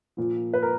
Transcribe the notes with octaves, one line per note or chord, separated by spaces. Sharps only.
A#2 F3
B4
A#4